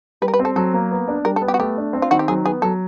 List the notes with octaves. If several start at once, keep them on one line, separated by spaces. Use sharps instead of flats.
G3 B4
A#4
B4
C4
A4
F#3 A4
A#3
B3
D4
G3 A#4
A4
B3
G4
F#4
A3 G4
D4
C4
F4
D#3 F#4
G4
F#3 G#4
B3 G#4
F#3 A4